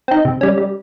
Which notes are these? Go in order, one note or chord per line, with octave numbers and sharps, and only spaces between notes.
C4 D#4
C3
G3 C#4
G3